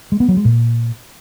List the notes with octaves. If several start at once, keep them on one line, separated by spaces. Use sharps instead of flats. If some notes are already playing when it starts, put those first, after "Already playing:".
G#3
B3
F#3
G#3
A#2